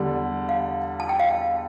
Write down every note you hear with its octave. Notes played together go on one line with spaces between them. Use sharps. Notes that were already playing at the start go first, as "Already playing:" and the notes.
Already playing: E2 D3 G3
F5
A5
G5
F5